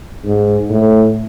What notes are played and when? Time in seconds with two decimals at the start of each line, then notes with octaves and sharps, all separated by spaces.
0.25 G#2
0.70 A2